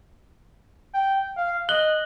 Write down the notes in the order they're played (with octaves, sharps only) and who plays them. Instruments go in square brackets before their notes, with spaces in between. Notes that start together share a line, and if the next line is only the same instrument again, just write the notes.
[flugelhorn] G5
F5
[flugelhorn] D#5 [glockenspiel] F#6 F#7 G7